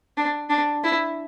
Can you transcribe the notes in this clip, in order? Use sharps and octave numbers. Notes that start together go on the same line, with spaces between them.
D4
D4
E4